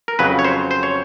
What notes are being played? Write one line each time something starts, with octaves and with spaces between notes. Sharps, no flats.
A#4
F2 C#3 F#3 B4
C#5
C5
C5
C#5